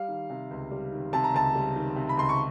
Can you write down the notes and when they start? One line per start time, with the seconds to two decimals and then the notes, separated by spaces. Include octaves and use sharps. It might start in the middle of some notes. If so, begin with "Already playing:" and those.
Already playing: G3 F5
0.08 D#3
0.30 C3
0.51 C#2
0.71 G3
0.92 D#3
1.13 C3 A5
1.24 A#5
1.34 C#2 A5
1.55 G3
1.76 D#3
1.96 C3
2.09 B5
2.17 C#2 C6
2.29 C#6